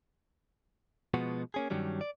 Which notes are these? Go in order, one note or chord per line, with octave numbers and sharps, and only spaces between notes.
B2 F3 G#3 B3 F#4
A#3 C#4 G#4
G2 D#3 F#3 G3 C#4
D5